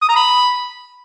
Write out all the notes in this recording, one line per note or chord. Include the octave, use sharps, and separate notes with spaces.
D#6
A#5
B5